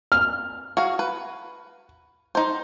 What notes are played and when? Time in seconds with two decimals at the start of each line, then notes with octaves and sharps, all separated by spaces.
0.12 F6
0.77 F#4 G#4 F5
0.99 B4
2.35 D#4 C5